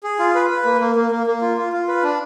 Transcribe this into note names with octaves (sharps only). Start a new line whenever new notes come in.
G#4
F4
B4
B4
A#3
A#3
A#3
A#3
A#3
F4
F4
F4
B4
D4